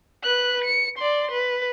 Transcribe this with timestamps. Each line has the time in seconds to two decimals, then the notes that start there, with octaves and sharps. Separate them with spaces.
0.23 B4 F#6
0.64 C#7
0.98 D5 C6
1.31 B4